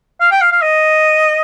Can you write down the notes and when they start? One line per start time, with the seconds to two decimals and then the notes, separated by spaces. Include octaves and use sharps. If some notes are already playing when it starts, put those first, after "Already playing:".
0.20 F5
0.31 G5
0.41 F5
0.52 F5
0.62 D#5